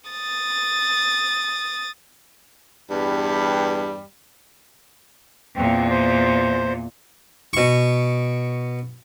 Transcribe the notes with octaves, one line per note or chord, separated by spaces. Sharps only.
D#6 A6
E2 G2 G3
E2 A#2 C4
C5
B2 C#6